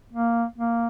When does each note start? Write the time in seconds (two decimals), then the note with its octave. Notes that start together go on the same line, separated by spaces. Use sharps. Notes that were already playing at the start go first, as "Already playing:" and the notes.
0.13 A#3
0.58 A#3